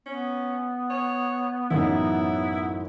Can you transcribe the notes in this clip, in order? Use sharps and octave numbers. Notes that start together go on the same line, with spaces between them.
B3 C#4
C#5
A1 F#2 D#4 E4